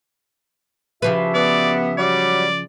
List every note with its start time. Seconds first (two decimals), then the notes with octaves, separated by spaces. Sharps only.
1.02 C#3 F3 F#4 G4 B4 E5
1.35 B3 D5
1.98 F#3 G3 D5